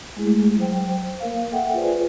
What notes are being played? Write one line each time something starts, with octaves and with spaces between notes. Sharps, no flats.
G#3 A3 E4 G#4
F#3 C5 G5
A#3 A#4 F5
A4 E5 F#5 G5
F4 G#4 B4 C5 D5 G#5